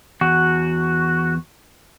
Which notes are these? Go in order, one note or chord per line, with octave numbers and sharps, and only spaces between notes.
E2 F#4